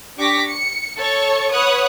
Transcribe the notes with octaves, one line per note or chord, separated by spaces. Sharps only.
D4 G4 C#6 D6 A#6 B6
C#7
A4 C#5 A5 C#6
B4 C#5 F#5 D#6 F#6